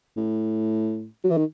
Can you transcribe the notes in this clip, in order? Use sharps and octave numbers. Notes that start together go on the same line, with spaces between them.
A2
F#3
E3
D#3